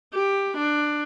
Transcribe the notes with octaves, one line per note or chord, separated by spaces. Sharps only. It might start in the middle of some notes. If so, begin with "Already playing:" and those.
G4
D4